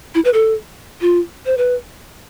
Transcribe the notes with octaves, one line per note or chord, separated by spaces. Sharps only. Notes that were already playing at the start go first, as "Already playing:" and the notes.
E4
B4
A4
F4
C5
B4